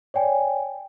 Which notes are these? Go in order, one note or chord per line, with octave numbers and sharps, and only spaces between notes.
C#5 D5 G5 G#5